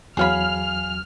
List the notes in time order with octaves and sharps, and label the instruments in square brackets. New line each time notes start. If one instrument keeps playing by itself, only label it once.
[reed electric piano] E2 F#3 [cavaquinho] G#4 F5 B5 [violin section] F6